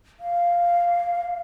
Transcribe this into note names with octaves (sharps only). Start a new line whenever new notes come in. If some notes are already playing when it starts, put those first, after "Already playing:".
F5